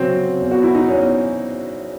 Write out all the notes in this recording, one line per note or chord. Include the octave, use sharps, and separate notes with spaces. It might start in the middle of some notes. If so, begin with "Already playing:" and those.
Already playing: C#3 F#3 C4
E2
F#4
E4
D#4
E2 C#4